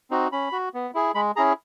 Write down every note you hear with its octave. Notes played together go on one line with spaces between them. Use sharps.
C4 D#4 F#4
C#4 B5
F#4
B3
E4 G#4
G#3 B5
C#4 E4 G#4 A#5